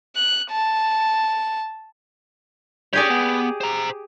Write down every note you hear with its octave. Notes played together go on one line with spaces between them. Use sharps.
F#6
A5
G4 G#4 C#5 D5 G#5
B3
C5 A#5